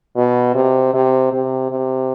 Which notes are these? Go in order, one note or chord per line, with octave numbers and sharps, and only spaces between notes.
B2
C3
C3
C3
C3